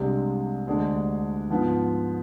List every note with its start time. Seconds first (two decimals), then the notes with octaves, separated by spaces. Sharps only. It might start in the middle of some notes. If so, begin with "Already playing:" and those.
Already playing: C2 C3 G#3 D4
0.67 D2 D3 G#3 D4
1.50 G#2 F3 B3